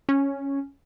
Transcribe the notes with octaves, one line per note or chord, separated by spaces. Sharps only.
C#4